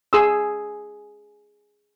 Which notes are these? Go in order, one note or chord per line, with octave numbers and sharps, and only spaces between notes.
G#4 C6 D#6 E6